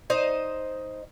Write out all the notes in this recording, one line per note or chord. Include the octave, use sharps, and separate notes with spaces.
D#4 C5 D#5